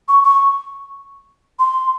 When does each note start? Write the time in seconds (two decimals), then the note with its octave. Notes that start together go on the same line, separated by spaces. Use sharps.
0.09 C#6
0.23 C#6
1.59 C6